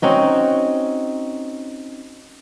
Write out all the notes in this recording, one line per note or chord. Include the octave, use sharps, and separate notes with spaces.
C4 C#4 D#4 F#4